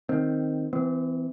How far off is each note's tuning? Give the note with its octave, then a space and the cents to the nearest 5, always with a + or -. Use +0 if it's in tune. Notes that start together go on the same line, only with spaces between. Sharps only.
D#3 +0 C4 +0
E3 +0 C4 -35